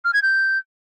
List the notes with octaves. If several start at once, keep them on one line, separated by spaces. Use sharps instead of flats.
F6
G#6
G6